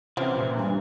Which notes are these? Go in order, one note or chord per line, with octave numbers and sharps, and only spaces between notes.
C3 E3 F3 C4 C#4
A#2
G2